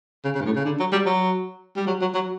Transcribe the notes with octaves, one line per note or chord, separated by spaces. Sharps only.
C#3
C#3
G2
A2
C#3
D3
F#3
G3
F#3
G3
F#3
F#3
F#3